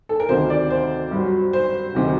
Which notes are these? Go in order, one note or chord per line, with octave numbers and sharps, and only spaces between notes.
A4
A#4
D2 C3 D#3 C5
D5
C5
G2
F#3
C5
D2 C3 D#3 F#3